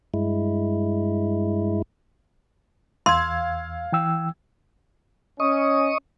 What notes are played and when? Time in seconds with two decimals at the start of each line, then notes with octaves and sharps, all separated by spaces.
0.14 G2 G#3 E4
3.06 E2 F5 C6 E6 G#6
3.92 E3 G5 E6
5.40 C#4 D#5 C#6 D#6